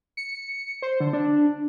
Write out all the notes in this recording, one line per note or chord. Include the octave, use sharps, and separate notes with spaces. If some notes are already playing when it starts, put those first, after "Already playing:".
C#7
C5
D3
D4